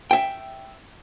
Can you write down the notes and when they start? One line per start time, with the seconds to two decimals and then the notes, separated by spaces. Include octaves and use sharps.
0.11 E5 G5